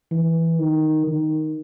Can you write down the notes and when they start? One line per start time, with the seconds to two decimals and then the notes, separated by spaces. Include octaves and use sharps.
0.11 E3
0.59 D#3
1.07 D#3